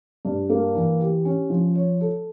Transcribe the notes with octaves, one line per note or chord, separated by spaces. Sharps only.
G2
A#3
E3
G4
C#4
F3
C#5
A4